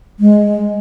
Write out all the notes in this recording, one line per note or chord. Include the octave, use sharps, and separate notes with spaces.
G#3